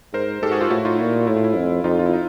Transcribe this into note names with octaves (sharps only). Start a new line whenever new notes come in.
G#2 A#4 C5
G#2 G4 A4
F#4 G#4
F4 G4
A2 E4 F#4
D#4 F4
A#2 E4
A2 E4
F4
E4
F2
F2 D#4 F4
F4
E4
D#4